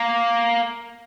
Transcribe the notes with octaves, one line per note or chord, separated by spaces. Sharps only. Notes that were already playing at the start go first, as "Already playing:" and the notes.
Already playing: A#3